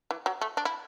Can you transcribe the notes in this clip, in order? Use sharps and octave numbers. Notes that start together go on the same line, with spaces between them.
E3
F#3
A3
D4
E4